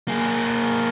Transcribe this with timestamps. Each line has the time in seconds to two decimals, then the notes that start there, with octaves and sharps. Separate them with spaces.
0.08 A#3 G#4